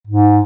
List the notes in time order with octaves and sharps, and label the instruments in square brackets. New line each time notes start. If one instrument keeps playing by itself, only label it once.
[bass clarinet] G#2